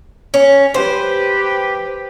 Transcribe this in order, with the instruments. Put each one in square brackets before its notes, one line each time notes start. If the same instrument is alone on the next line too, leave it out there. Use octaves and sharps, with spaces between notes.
[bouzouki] C#4
[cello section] G4 B4 [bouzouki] C5